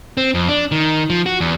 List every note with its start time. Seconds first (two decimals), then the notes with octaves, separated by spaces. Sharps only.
0.17 C4
0.34 F2
0.49 D4
0.72 D#3
1.10 F3
1.26 F#4
1.40 E2